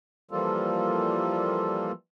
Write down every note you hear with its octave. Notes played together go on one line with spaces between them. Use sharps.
E3 F3 G3 A#3 F4 A4